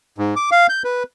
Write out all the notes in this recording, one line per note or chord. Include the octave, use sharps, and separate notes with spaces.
G#2
D6
F5
G6
B4